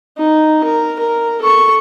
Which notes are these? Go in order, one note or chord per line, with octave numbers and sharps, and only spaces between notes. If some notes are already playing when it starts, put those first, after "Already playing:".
D#4
A#4
A#4
A4 C#6